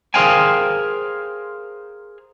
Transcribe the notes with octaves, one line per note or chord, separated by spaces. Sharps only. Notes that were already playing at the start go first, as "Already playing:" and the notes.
G#4 A#4 C5 F5 G5 G#5